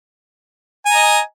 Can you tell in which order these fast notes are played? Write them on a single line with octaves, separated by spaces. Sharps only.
G#5 A#5 D#5